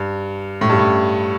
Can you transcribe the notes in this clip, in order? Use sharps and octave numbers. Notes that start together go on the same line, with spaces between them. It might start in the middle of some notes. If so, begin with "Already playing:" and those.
Already playing: G2
A2
G2
A2